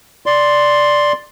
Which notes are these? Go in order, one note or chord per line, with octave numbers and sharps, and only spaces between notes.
D5 C6